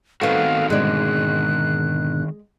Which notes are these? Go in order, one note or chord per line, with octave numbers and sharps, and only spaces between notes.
D#3 A3 B3 C4 F#4 F5
G#2 B2 D3 G#3 D5 F#6